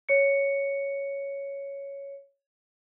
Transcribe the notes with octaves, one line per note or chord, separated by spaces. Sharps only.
C#5 C#7